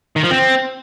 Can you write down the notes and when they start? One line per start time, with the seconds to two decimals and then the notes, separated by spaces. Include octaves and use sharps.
0.16 D#3
0.23 F3
0.31 C4